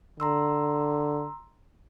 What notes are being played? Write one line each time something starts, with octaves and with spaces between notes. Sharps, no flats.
D3 A#5 C6 E6